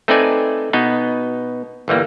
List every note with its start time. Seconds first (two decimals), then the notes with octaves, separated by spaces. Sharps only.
0.08 A3 C4 D#4 B4 D5 G#5
0.73 B2 B3 D#4
1.88 G1 E3 G3 A#3